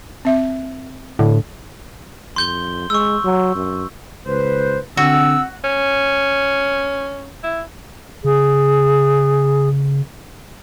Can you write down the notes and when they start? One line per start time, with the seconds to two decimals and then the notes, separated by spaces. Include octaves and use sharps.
0.25 C4 E5
1.19 A2 D3
2.36 F2 C6 G6 G7
2.90 G#3 C#6 E6
3.24 F#3
3.55 F#2
4.26 C#2 B4 C5
4.97 D3 C4 F#4 E6
5.64 C#4
7.43 E4
8.24 C#3 G#4